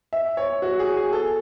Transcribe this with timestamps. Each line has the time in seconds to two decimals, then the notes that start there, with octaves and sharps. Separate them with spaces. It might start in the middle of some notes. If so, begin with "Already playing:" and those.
0.13 E5
0.37 C#5
0.62 F#4
0.79 G#4
0.96 G#4
1.13 A4